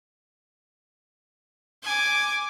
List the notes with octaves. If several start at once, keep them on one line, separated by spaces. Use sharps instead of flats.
G#5 D6